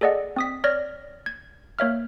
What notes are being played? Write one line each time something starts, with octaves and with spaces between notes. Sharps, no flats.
G#4 A4 D5 D#5 F#5
C4 D#6 B6
C#5 D5 F6 A#6
G#6
A#3 C#5 E5 F6